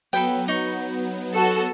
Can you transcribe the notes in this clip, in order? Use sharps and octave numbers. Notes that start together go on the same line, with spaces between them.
F#3 B3 A4 B4 G5
D#4 C#6
F#4 A4